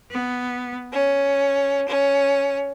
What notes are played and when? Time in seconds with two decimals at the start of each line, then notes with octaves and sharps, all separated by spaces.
0.11 B3
0.92 C#4
1.87 C#4